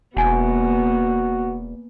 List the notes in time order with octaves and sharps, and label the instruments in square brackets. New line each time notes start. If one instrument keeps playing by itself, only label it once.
[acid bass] E1 [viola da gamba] A#3 B3 [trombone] F#4 [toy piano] F#5 G#5